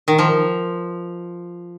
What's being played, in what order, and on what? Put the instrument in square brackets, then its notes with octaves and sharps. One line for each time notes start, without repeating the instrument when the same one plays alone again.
[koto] D#3
F3